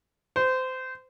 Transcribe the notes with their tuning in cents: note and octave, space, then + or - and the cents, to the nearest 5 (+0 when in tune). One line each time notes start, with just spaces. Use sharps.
C5 -25